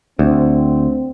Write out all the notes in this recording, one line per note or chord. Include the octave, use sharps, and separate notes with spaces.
D2 C4